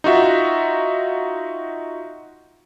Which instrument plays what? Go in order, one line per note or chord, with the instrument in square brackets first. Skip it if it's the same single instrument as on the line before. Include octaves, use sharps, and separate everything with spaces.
[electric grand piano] D#4 F4 F#4 E5